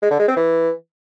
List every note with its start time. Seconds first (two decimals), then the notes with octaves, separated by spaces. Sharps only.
0.02 G#3
0.11 D3
0.19 G#3
0.28 C4
0.37 E3